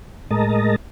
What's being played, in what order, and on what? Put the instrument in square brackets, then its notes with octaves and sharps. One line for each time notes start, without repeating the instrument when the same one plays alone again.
[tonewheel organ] A2 G#3 A#4 D#5 A5 A#5